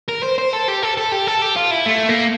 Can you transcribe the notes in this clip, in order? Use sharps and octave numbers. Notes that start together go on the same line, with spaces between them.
A#4
C5
C5
A4
G4
A4
A4
G4
A4
G4
F4
E4
A3
A#3